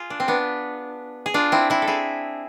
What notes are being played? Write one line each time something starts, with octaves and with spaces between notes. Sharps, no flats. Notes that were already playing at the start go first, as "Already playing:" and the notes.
Already playing: F4 G#4
D4
C4
B3 D4
G#4
D4 F4
C4 E4
C4 E4
A4
E4 G#4